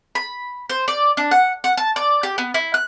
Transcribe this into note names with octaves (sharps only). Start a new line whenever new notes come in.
B5
C5
D5
D4
F#5
F#5
A5
D5
G4
B3
E4
F#6